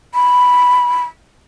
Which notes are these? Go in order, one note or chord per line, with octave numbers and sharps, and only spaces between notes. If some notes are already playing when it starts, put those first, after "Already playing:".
B5